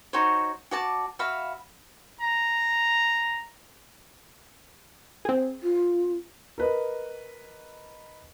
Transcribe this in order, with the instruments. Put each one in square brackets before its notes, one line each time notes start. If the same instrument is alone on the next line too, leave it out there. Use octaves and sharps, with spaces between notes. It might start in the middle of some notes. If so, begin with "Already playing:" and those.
[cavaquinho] D#4 F#4 C5 C#5
F#4 D5 A5
F#4 E5 F5 B5
[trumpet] A#5
[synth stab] C4 G#4
[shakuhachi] F4
[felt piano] A#4 B4 D#5